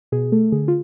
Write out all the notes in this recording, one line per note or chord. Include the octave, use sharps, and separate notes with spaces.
B2 G#4
A3 A4
D3 G#4
F4